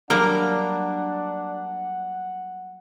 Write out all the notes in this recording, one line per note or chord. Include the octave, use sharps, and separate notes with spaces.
F#3 G3 A#3 D4 A#4 F#5